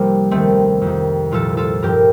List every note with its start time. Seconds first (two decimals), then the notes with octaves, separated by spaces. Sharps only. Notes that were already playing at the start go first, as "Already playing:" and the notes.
Already playing: C2 C3 F3 G3 A#3
0.31 D#2 D#3 A3 C4
0.82 F2
0.87 D#3
1.31 C2 A#2 F3 F4 A4
1.57 F4 A4
1.82 G2 F3 G4 A#4